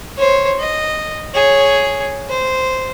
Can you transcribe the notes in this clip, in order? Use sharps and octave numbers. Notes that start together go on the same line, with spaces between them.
C5 C#5
D#5
G#4 C#5
C5